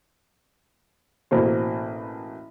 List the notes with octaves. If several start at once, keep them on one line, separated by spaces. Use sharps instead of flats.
A1 B2 A#3 C4 C5